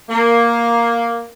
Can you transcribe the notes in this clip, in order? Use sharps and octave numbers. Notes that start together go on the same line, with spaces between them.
A#3